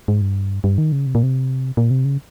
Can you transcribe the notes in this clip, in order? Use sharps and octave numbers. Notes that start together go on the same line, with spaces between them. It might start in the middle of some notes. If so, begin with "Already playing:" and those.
G#2
G2
G2
D#3
C#3
C3
A#2
C3
A#2
C3
C#3